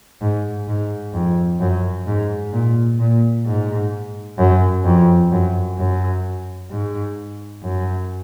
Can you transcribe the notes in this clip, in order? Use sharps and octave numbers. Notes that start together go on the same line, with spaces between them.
G#2
G#2
F2
F#2
G#2
A#2
A#2
G#2
F#2
F2
F#2
F#2
G#2
F#2